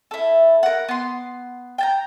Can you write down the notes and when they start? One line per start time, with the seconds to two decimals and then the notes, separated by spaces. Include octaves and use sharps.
0.11 E4 A4
0.63 A#4 F#5
0.89 B3 C6
1.78 G5 A5 A#5